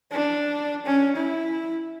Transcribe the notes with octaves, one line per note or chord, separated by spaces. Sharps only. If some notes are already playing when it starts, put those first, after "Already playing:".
D4
C#4
E4